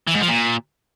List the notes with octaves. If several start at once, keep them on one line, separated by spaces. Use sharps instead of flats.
E3
G#2
F3
A#2